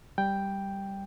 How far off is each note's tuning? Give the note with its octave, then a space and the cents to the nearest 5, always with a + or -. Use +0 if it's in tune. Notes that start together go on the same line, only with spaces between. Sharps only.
G3 +0 G5 +5